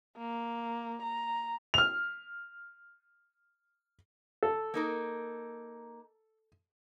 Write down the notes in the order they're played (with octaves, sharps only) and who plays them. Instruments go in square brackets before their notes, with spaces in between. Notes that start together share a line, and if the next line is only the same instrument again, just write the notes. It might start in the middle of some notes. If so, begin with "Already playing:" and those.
[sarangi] A#3
A#5
[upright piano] F6 F7
[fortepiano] A4
[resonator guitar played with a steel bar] A#3 D#4 A#4